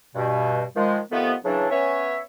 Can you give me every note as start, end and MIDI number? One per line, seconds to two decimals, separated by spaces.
0.15 0.62 43
0.15 0.62 47
0.76 0.98 51
0.76 0.98 53
0.76 0.98 56
1.11 1.33 48
1.11 1.33 51
1.11 1.33 53
1.11 1.33 57
1.11 1.33 59
1.45 1.66 49
1.45 1.66 52
1.45 1.66 54
1.45 1.66 62
1.70 2.18 59
1.70 2.18 61
1.70 2.18 73
1.70 2.18 76